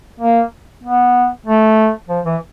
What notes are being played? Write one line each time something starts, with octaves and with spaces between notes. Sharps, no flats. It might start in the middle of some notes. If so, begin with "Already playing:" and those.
A#3
B3
A3
F3
E3